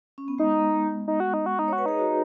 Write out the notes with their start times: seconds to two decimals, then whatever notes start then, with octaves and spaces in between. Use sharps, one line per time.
0.18 C#4
0.28 B3
0.38 G#3 D#4
1.08 D#4
1.20 F#4
1.34 D#4
1.46 F#4
1.59 D#4
1.68 F#4 C#5
1.78 B4
1.86 D#4 G#4
1.99 F#4